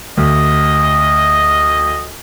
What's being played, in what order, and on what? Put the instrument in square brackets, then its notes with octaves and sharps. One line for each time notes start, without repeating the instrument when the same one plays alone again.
[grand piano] D2 [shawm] D#5